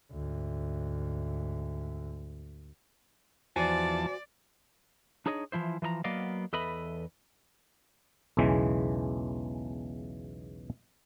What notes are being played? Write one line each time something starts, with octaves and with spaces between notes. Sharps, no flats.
D2 G#2
E2 F3 F#4 C5 D5 G#5 A5
D4 D#4 G#4 C#5 D#5
E3 F3 E4 C5
E3 F3 D#5 A#5
F#3 A#3 B3 D5 D#5 F5
E2 A4 B4 D#5 E5 B5
B1 E2 C#3 E3 G#3